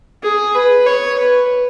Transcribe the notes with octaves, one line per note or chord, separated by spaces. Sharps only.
G#4
B4
C#5
B4